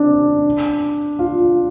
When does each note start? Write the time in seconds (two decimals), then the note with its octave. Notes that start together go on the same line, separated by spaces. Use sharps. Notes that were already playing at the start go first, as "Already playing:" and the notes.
Already playing: C4 D4
1.19 F4